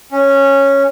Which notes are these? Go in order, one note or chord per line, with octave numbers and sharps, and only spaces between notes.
C#4